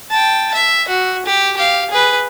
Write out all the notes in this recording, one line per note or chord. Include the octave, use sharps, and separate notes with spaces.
G5 A5
E5
F#4
G4
G4 F5
G#4 B4